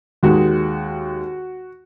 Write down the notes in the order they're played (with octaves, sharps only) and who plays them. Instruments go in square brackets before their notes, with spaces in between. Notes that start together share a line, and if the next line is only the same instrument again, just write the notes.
[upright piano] D#2 D#3 G#3 F#4